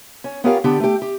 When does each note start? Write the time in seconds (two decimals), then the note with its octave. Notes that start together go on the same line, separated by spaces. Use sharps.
0.24 C#4
0.44 B3 C#4 F4 G4 A#4 F5
0.64 D3 B3 D4 G4
0.80 A3 G4
1.02 G4